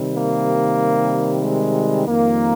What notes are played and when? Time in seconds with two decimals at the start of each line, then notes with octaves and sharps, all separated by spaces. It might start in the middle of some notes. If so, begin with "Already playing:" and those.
Already playing: C3 D#3 G3
0.16 A#3
1.44 G#3
2.07 F2 D#3 G3 A#3